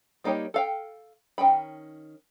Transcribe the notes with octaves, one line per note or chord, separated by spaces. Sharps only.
G3 A#3 D#4 G4 C#5
A4 F5 G5
D#3 C#4 G5 B5